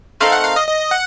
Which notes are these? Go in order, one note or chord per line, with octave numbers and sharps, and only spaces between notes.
A3 C4 D#4 A#4 F5
F#5
F5
D#5
D#5
F#5